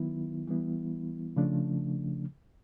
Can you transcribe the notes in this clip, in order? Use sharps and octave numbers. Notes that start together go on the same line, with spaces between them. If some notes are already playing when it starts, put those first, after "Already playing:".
Already playing: D#3 F#3 B3 E4
E3 G3 B3 E4
C#3 F3 A3 D4